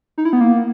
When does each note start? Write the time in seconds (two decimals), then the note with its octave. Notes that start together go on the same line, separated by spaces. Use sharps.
0.18 D#4
0.25 E4
0.33 B3
0.41 A#3